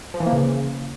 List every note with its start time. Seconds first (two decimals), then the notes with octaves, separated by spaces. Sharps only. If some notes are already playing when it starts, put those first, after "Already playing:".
0.14 F3
0.20 E3
0.26 A#3
0.33 C#3